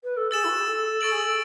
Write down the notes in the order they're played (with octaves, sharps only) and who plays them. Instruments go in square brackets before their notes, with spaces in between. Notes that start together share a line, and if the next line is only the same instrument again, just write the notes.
[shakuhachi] B4
A4
[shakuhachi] G#4 [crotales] E6 A6 E7
[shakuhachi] E4
F#4
G#4
A4
[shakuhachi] A4 [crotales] C#6 E6 A6 D7 F#7
[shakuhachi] G#4
A4